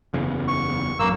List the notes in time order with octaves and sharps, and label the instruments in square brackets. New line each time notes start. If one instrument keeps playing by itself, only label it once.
[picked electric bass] F#1 E2 C#3
[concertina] C#6
[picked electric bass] A1 F#2 [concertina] A#3 E6